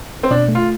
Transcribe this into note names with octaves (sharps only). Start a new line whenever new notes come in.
C4
B2 D4
A3
F4